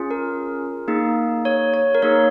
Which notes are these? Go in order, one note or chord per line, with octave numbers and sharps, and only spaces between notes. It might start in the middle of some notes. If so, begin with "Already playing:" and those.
Already playing: C#4 F4 G#4
A#4
A#3 D#4 G#4
C#5
C#5
A#4
A#3 D#4 G#4 C#5